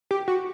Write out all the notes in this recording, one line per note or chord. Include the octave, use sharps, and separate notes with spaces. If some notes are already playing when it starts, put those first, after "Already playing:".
G4
F#4